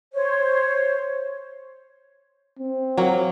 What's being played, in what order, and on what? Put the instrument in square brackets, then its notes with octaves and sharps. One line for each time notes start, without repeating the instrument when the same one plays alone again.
[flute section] C5 C#5
[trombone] C4
[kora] F#3 A#3